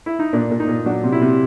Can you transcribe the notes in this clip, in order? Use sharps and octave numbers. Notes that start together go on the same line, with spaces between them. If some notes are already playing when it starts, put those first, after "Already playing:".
E4
D#4
A#2 D4
A#2
D#4
A#2
F#3 D4
C3
E4
C3